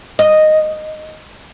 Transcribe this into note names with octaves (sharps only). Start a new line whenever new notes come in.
D#5